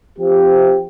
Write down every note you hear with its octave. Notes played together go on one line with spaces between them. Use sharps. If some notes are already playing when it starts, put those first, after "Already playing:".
F3 C4 G4